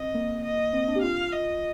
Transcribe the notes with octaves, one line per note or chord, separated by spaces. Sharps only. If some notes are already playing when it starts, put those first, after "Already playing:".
Already playing: C4 D#5
A#3
D#5
C4
D4
G4
F4 F5
D#5